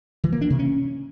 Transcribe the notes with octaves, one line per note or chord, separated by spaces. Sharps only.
E3
A#3
D4
C3
C#4